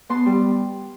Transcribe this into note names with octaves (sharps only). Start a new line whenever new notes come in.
B3 A5 C6
G3